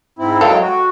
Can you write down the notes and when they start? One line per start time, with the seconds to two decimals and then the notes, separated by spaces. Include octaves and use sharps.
0.19 G#2 C4 E4
0.41 F#3 G#3 A4 F5 G5
0.61 F#4